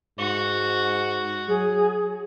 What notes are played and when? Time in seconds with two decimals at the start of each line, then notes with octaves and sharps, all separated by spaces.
0.19 G#2 F#4
1.48 F#3 G#4